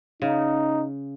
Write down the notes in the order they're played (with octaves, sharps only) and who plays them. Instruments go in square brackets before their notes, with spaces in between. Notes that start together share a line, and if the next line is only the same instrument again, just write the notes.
[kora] C#3 [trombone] D#4